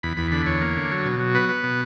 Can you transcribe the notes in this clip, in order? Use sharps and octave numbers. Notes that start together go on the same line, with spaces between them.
E2 B5
E2 B5
D3 B5
E2 C#5
A#3
D3
F#3
B2
F#3
B3 B4
B3
B2